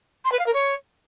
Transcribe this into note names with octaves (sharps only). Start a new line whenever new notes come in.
C6
B4
F5
A#4
C#5